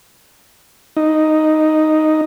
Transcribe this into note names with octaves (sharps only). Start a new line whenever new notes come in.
D#4